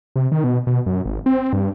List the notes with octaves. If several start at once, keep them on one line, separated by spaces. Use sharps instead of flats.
C3
D#3
B2
B2
F#2
G#1
C4
G2